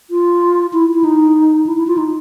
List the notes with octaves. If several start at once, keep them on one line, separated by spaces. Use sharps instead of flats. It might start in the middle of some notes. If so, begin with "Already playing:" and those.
F4
E4
E4
D#4
E4
E4
F4
D#4